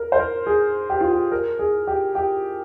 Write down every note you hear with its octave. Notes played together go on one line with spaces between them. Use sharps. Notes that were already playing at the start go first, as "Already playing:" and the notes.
Already playing: A#4
C5
A#4
G#4
G4
F4
G4
A#4
G#4
G4
G4